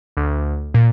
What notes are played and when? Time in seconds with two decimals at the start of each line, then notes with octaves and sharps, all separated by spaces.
0.17 D2
0.74 A#2